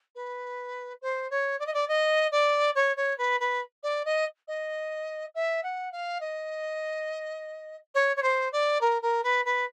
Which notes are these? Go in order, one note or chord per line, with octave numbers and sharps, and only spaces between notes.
B4
C5
C#5
D5
D#5
D5
D#5
D5
C#5
C#5
B4
B4
D5
D#5
D#5
E5
F#5
F5
D#5
C#5
C#5
C5
D5
A#4
A#4
B4
B4